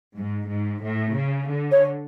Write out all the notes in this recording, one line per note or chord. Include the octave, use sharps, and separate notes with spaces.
G#2
G#2
A2
C#3
D3
C#5